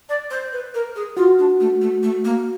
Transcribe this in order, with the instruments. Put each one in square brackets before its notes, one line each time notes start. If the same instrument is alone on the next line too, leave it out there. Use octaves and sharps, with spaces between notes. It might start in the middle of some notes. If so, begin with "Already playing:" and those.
[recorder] D5
C5
B4
A#4
G#4
[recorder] F4 [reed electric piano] F#4
[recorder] D4
A3
A3
A3
A#3